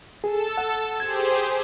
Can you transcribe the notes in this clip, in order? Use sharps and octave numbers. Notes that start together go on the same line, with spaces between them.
G#4 A4 A5 E6
F#5
G4 G#4 C5 G#6